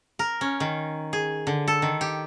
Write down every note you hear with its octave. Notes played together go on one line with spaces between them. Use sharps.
A#4
C#4
D#3
G#4
D3
A4
D#3
G4